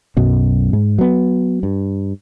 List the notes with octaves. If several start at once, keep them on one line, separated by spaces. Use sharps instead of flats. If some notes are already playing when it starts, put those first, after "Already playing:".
B1 F#2 B2
G#2
F#3 B3
G2